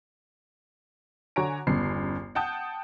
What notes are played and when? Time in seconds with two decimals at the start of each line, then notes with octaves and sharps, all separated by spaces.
1.36 D3 F#4 C#5 G#5 A#5 D7
1.67 G1 E2 G2 C#3 C7
2.35 F#5 G5 A5 D#6 G6